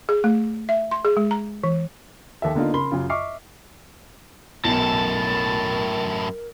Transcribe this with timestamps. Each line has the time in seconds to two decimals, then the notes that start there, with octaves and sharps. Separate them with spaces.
0.09 G#4
0.24 A3
0.69 E5
0.91 C6
1.05 G#4
1.17 G#3
1.31 A#5
1.64 E3
2.42 D#2 A4 E5
2.55 D3 A#3 B3 D4 D#4 F4
2.74 C#3 A#4 B5 C6 G7
2.92 F#2 C#3 F4
3.10 D#5 E5 C#6 D6 F6 C7
4.64 B1 F#2 A2 A#4 A5